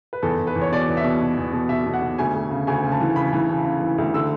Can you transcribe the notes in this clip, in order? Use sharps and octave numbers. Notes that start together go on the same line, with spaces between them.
B4
E2 A4
E2
B4
E2
C#5
B2 D5
E2
E5
B2
B2
E2
B2
B2 E5
B2
F#5
B2
D2 G#5
D2
C#3
D2 G#5
C#3
A5
E3
C#3 B5
E3
C#3
C#3
E3
D2
D3 E6